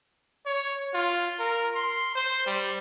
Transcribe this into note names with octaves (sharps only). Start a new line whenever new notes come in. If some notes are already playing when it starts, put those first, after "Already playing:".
C#5
F4
A#4
C6
C5
G3